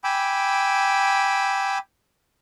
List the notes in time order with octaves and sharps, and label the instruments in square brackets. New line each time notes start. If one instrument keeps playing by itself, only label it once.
[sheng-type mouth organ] G5 G#5 B5 D6 E6